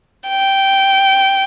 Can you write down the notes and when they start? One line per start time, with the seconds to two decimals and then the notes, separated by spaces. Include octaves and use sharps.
0.29 G5